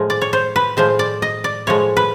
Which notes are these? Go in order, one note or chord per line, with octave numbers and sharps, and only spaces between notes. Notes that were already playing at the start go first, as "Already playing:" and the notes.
Already playing: A2 F3 G#3
D5
C#5
C5
B4
A2 F3 G#3 C5
D5
D#5
D5
A2 F3 G#3 C#5
B4